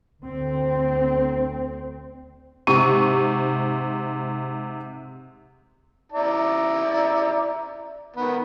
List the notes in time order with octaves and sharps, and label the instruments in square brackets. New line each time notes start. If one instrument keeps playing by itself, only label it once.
[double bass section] D2 C4
[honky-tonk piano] G#2 C3 C#6 D#7
[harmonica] E4 D5 A#5
D#3 B3